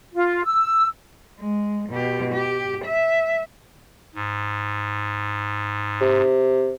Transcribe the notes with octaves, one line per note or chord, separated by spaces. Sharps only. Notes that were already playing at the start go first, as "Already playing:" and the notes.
F4
E6
G#3
B2 G4
G4
E5
G#2
C3